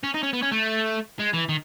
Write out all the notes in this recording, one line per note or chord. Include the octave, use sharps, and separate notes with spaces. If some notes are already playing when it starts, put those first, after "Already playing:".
C#4
D#4
C#4
B3
C#4
A3
G#3
E3
D#3